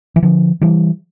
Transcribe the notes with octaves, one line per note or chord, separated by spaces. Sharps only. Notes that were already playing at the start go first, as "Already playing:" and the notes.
E3
D3 F3
E3 G3